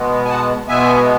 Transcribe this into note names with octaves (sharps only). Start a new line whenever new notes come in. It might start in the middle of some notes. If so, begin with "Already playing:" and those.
Already playing: B2 G#3 B3
G#5
F#5 A5
B2 G#3 B3 E5 G#5